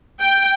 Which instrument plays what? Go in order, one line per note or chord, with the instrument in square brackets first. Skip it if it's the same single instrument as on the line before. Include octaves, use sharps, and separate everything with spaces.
[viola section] G5